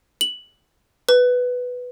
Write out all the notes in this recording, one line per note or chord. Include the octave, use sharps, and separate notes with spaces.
F#7
B4